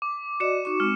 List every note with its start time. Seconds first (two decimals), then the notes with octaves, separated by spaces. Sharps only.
0.02 D6
0.40 F#4 D5 D#5 C#7 E7
0.65 D#4 F#4 C#6
0.80 G#3 C4 F6